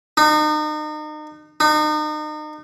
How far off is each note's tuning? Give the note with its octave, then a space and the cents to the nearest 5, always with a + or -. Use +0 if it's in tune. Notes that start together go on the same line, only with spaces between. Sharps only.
D#4 -35
D#4 -35